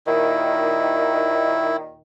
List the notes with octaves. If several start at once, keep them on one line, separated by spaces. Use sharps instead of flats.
D#2 A#2 D#3 E4